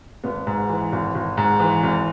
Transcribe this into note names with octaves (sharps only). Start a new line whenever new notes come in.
G#1 B3
G#2
E3
G#1
G#1
G#2
E3
G#1